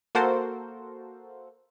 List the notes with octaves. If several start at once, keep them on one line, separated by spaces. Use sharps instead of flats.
A#3 F#4 A4 A#4 C5